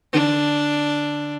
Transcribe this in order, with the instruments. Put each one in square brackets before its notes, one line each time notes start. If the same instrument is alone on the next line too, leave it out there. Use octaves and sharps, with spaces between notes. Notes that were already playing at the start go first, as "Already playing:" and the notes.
[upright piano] D3 [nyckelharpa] D4